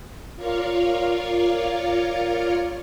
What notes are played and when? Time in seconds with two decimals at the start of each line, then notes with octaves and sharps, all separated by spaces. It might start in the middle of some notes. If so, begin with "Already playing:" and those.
0.36 F4 A#4 C#5 D5 F5 C#6